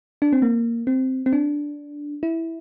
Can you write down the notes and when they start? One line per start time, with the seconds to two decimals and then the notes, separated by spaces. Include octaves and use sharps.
0.22 D4
0.33 C4
0.42 A#3
0.87 C4
1.26 C4
1.33 D4
2.23 E4